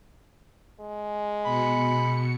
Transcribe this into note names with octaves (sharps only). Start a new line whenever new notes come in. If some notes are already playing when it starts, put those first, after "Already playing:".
G#3
B2 B5 C#7